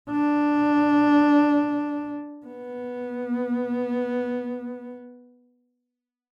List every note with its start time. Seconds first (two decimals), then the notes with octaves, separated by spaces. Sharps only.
0.10 D4
2.46 B3